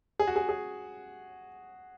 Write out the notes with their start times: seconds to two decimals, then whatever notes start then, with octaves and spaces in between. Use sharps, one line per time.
0.19 G#4
0.28 F#4
0.36 G#4
0.49 G#4